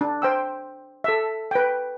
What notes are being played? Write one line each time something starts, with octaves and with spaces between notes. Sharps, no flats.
D4
C5 G5 E6
A4 E5
B4 G5